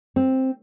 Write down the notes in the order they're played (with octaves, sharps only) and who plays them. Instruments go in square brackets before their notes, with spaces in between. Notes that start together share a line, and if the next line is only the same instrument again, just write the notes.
[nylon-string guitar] C4